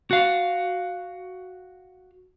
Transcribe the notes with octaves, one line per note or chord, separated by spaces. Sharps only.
F#4 F5